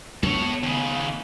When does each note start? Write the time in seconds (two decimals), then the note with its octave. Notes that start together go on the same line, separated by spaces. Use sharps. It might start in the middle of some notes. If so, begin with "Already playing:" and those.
0.23 B3 A4 C#5
0.63 D#2 C#3